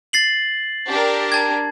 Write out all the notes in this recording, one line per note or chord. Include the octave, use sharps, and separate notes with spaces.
A6 C7 F#7
D4 G4 A#4
A5 G#6